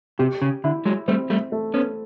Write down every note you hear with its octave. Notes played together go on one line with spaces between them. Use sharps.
C3 G4
C#3
D3 E4
F#3 G#3
G3 A3 C4
G3 A3
A3
B3 C#4